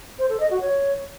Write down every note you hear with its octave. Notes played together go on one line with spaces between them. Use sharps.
C5
A4
D#5
F#4
C#5